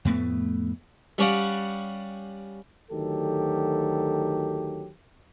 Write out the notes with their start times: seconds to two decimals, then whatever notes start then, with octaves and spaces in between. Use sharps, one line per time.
0.05 F2 A2 A3 B3
1.18 G3 C#4 D5 F5 F#5
2.91 D2 D#3 F#3 G4 A4